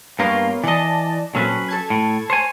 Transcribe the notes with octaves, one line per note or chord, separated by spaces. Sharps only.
G2 A#3 B3 F4 A#4 C#5
E3 D5 D#5 A5
A#2 F#3 C4 C#4 A4 B4
A4 A5 G#6
A2
C5 C#5 G#5